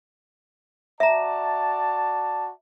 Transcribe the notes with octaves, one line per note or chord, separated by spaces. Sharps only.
F#4 D5 E5 A5 A#5